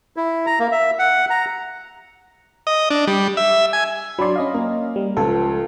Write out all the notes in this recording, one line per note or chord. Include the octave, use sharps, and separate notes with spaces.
E4
A#5
A#3
E5
F#5
A#5
D#5
D4
G3
E5
G#5
F#3 D4 D5 B5 C6
C#4 D#5 F5
A#3
G3
C#2 F3 A4